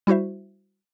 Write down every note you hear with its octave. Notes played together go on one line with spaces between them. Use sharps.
G3 E4 F#4 C5 E5